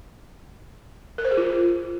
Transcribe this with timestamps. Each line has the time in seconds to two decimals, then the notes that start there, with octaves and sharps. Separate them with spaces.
1.18 A#4
1.25 C5
1.31 G#4
1.37 F4